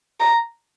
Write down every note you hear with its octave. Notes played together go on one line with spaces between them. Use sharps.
A#5